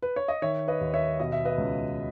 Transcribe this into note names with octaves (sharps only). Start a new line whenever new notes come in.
B4
C#5
D#5
D#3 C#5 E5
B4 D#5
D#2
C#5 E5
B2 D#5
E5
B4 D#5
C#2